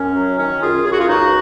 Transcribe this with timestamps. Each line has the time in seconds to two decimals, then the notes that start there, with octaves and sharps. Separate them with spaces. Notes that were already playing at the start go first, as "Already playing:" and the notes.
Already playing: F#2 C#4
0.15 F#3
0.37 D#3 C#4
0.61 F#2 F4 G#4
0.84 F#2 G#4
0.91 F#4
0.99 F4 G#4
1.08 C#2 D#4 F#4